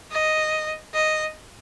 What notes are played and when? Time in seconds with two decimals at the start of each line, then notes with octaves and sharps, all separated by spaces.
0.12 D#5
0.94 D#5